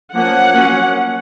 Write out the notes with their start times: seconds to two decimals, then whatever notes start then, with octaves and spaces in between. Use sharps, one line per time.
0.13 F3 A#3 C#4 F#5
0.53 F#3 A#3 C#4